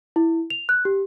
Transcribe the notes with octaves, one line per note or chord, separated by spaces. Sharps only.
E4
F7
F#6
G4